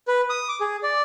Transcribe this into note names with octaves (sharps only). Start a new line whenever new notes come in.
B4
D#6
D6
G#4
D5